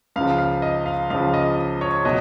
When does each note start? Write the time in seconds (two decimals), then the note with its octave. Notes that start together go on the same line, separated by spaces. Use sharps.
0.16 C#2 C#3 F3 F5
0.39 F5
0.62 D#5
0.86 F5
1.10 C#2 C#3 F3 F5
1.34 D#5
1.81 C#5
2.04 B2 F#3 D#5